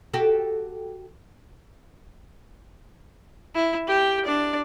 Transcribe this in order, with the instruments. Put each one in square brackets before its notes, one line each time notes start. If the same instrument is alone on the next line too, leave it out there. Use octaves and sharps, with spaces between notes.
[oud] F#4 G4 A4
[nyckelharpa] E4
G4 G5
D4 D5